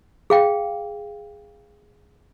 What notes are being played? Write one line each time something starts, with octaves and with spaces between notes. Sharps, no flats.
G#4 F5 G5